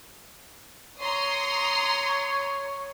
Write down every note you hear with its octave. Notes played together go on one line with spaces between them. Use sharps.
C#5 A#5 C6 D#6